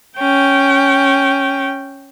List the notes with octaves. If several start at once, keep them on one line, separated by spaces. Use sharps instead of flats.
C#4 G5